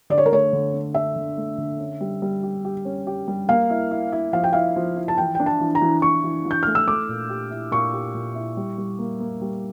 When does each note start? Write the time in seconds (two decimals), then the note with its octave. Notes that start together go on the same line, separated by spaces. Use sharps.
0.10 D3 D5
0.18 C#5
0.26 A#4
0.32 A3 C#5
0.53 D3
0.74 D4
0.94 D4 E5
1.16 D3
1.37 A3
1.58 D3
1.79 C#4
2.01 G3
2.22 G3
2.43 G4
2.65 G4
2.85 C#4
3.07 G4
3.28 G3
3.49 A#3 F5
3.70 E4
3.91 E4
4.12 E4
4.33 F3 F5
4.44 G5
4.53 E4 F5
4.76 F3
4.97 E4
5.08 A5
5.18 E3 G5
5.35 D4 G5
5.46 A5
5.60 E3
5.75 A#5
5.82 E3
6.02 D4 C#6
6.24 E3
6.45 E3
6.51 G6
6.63 A3 F6
6.75 E6
6.88 A3 D6
7.09 A#2
7.29 G4
7.51 E4
7.71 A#2 C#6
7.93 G4
8.15 A#2
8.35 E4
8.57 G3
8.78 G3
8.99 A#3
9.20 A#3
9.41 G3